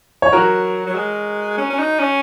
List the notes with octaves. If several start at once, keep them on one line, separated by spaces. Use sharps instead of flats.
C#5
F#3 F#4 A#4
F#3
G#3
C#4
C#4
D#4
C#4